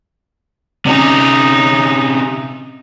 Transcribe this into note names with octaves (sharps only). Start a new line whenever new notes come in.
C3 C#4 D#4